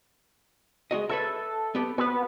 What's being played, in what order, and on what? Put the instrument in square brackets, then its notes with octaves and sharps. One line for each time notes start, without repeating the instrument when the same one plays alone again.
[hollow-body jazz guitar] G#3 F#4 D#5
[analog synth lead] A4 [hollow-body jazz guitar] B4 C#5 E5
[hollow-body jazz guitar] B3 G4
[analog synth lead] B3 [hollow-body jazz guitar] F#4 B4